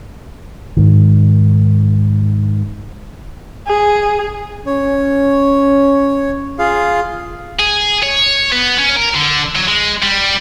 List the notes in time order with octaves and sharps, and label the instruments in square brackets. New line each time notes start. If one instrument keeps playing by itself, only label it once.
[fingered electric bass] G#2 D#3
[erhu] G#4
[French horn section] C#4 [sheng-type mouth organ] C#5
[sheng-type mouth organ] F4 G#4 F5
[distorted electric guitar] G#4
C#5
B3
C#4
A#4
D3
F#3
G#3
G3